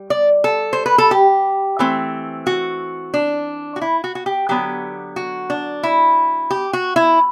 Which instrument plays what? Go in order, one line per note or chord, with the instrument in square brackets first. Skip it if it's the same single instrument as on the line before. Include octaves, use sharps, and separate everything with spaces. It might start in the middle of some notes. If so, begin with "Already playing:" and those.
Already playing: [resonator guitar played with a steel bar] G3
D5
A4
C5
B4
A4
G4
E3 A3 C4
F#4
D4
F#4
E4
F#4
F#4
G4
D3 F#3 B3 G4
F#4
D4
E4
G4
F#4
E4